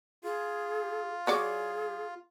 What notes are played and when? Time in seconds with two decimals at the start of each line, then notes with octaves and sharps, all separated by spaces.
0.24 F4 G#4
1.27 F#3 G#4 C#5 D5